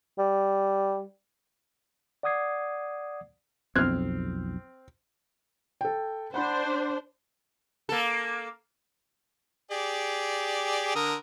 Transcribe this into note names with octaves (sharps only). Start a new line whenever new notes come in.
G3
D5 F#5 D6 D#6 G#6 C7
B1 F2 C4 F6 F#6 G#6
A4 G5
D4 C5 F#5 B5
A#3 A4
G4 G#4 D5
D3 A#4 D#6